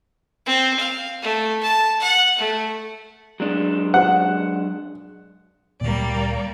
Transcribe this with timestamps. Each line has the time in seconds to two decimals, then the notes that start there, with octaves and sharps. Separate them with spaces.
0.46 C4
0.80 F5
1.22 A3
1.63 A5
2.00 F#5
2.39 A3
3.40 F#3 G#3 D4
3.94 F#5
5.81 D2 A#2 G3 A#3 D5